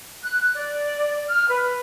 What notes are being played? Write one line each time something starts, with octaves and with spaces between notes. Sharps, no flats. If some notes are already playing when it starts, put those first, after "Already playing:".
F#6
D5
F6
B4